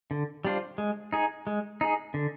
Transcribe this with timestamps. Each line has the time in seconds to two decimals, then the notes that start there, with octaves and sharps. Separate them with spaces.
0.11 D3
0.45 G3 D4 F4 C5
0.78 G#3
1.13 D#4 G#4
1.47 G#3
1.81 D#4 G#4
2.14 D3